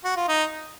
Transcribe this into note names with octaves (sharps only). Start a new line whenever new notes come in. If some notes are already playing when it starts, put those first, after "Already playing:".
F#4
F4
D#4